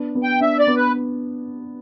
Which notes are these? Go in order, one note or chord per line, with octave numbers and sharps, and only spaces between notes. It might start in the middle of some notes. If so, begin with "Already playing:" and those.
Already playing: B3 D4
B3
G5
D4 E5
D5
B3
B4